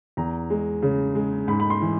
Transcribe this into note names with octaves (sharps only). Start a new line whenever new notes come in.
E2 A#5
G#3
C#3
G#3
G#2 B5
B5
C6
E3